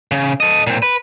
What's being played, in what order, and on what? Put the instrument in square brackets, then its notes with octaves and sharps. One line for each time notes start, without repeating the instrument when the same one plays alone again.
[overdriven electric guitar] C#3
A4 D#5
A#2 C4
B4